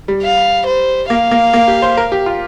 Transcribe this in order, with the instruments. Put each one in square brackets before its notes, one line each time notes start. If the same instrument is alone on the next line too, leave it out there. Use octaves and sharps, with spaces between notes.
[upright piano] G3
[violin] F5
C5
[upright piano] A#3 [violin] F5
[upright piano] A#3
A#3
G4
C5
A#4
G4
F4